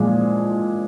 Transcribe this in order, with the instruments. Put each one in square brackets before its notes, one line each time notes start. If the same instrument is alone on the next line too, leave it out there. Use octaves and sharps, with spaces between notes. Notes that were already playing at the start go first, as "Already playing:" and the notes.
Already playing: [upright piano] A#2 F3 G#3